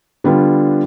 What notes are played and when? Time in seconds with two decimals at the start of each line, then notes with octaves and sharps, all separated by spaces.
0.24 D3 G3 B3 D4 F4